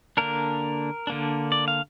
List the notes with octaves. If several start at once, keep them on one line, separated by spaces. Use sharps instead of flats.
D3 A#3 D4 A#4
D3 A#3 D4
D5
F5